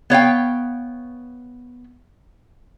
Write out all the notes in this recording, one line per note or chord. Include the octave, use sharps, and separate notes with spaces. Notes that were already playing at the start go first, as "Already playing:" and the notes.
B3 C#5 F5 G5